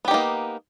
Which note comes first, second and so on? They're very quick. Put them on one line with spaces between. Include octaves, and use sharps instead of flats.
B3 G4 D#4 A#3